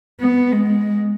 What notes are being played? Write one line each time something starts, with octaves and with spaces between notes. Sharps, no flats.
B3
G#3